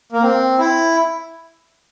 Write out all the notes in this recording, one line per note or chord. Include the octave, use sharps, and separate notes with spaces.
A#3
C4
E4